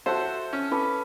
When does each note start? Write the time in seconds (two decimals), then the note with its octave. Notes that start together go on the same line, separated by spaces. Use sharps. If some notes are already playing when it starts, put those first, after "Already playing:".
0.06 F#4 A4 C5 E5
0.53 C#4
0.71 A4 B4 D6